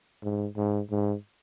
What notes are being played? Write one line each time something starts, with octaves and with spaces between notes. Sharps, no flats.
G#2
G#2
G#2